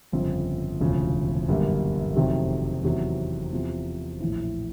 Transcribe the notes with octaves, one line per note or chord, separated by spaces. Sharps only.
G1 F2 C#3 F3
E1 D2 C#3 F3
G1 F#2 D3 G3 A#3
F1 F2 C3 D#3 F#3
E2 C3 D#3 F#3
E2 C3 F3
A#1 A2 E3